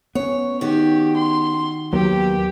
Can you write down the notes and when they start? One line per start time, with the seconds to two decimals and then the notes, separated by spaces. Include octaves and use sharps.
0.15 B3 C#4 C#5
0.61 D#3 F#4 G4
1.16 C6
1.93 D#2 F#3 A#3 B3 G4